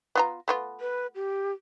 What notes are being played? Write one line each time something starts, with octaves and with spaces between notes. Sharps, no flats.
B3 F4 A#5
A3 B3 F4
B4
G4